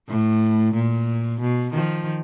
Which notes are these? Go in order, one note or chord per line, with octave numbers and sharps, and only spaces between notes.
A2
A#2
B2
D#3 F3